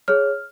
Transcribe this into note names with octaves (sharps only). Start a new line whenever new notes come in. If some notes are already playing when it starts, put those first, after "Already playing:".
G#4 C#5 F6